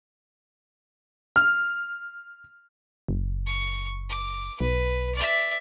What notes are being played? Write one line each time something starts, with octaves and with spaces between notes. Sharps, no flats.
F6
F#1
C#6
D6
B1 B4
D5 E5